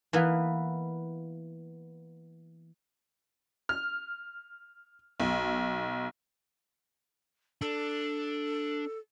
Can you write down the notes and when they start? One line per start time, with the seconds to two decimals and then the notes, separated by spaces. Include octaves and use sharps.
0.13 E3 A#3 B3
3.69 F6
5.20 B1
7.61 D4 A4